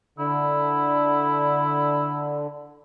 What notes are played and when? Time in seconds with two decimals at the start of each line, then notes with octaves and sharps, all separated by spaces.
0.19 D3 E4